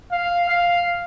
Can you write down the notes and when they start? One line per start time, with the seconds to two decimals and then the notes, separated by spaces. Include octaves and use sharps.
0.11 F5
0.49 F5